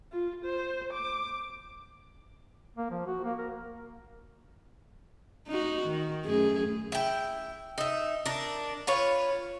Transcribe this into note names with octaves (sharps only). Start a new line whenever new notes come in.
F4
C5
D6
A#3
F3
F#4
A#3
A#4
D#4 F#4
D#3
F#2 A3 G#4
E4 G5
D#4 E5
D4 A#4
F4 B4 C#5